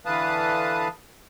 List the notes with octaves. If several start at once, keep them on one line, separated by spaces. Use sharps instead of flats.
D3 E3 B4 F5 A5 D#6